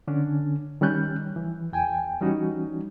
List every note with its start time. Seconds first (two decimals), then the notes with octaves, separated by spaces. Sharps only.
0.08 D3 C#4 D4
0.81 D#3 G3 C#4 F#6 G6
1.36 E3
1.73 E2 G5 G#5
2.21 E3 G3 C#4 D#4 F#4